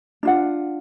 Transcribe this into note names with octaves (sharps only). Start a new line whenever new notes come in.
D4 F4 F#5